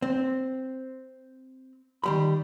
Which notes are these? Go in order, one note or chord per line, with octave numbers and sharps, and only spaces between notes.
C4
D#3 G3 B5